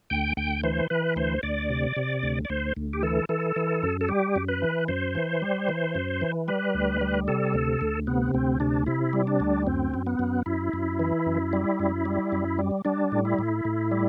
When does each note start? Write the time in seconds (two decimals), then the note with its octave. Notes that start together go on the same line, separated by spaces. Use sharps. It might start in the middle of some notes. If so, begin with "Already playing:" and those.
0.10 D2 G5
0.37 D2 G5
0.64 E3 C5
0.90 E3 B4
1.16 D2 C5
1.43 D2 D5
1.70 C3
1.96 C3
2.23 D2
2.45 D5
2.49 D2 C5
2.77 D2
2.93 G4
3.03 E3 A4
3.29 E3 A4
3.56 E3
3.83 F#2
4.01 A4
4.09 G3 G4
4.36 F#2
4.48 B4
4.62 E3
4.88 F#2 C5
5.15 E3
5.42 G3
5.69 E3
5.95 F#2
6.21 E3
6.48 G3 B4
6.74 D2
7.01 G3
7.28 C3 A4
7.54 D2
7.81 D2
8.07 C3 B3
8.34 D2 C4
8.60 C3 D4
8.86 C3 E4
9.13 G3
9.27 D4
9.40 D2
9.67 F#2 C4
9.94 F#2
10.07 B3
10.19 F#2
10.46 F#2 E4
10.73 F#2
10.99 E3
11.26 F#2
11.53 G3
11.79 F#2
12.05 G3
12.32 F#2
12.59 G3
12.85 G3 D4
13.12 A2
13.25 E4
13.39 A2
13.65 A2
13.91 G3